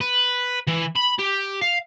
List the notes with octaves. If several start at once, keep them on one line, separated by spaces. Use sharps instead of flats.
B4
E3
B5
G4
F5